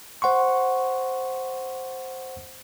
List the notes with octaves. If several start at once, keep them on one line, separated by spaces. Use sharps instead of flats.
C5 F#5 C6 C#6